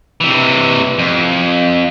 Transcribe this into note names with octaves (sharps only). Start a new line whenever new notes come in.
C3 E3
F2